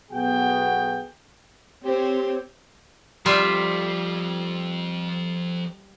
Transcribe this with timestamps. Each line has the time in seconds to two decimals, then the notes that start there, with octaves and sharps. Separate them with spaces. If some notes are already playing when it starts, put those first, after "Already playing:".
0.11 B1 B2 B3 F#4 G#4 G5
1.85 C4 G4 C5 C#5
3.26 F2 F3 G3 F4 E5